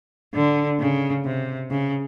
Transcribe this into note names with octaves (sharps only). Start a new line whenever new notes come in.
D3
C#3
C3
C#3